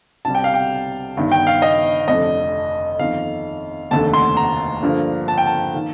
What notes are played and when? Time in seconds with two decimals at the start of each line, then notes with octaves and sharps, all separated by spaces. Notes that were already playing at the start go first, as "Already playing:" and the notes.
0.25 C2 C3 G3 A5
0.35 G5
0.44 F5
0.54 G5
1.17 G1 G2 D#3
1.32 G5
1.47 F5
1.62 D#5
2.08 F1 F2 D3 D#5
2.99 G1 F2 D#3 F5
3.91 F1 D#2 D3 A3 A5
4.14 C6
4.37 A#5
4.83 G2 D3 F3 A#3
5.28 A5
5.38 G5
5.46 A5
5.74 D#3 A#3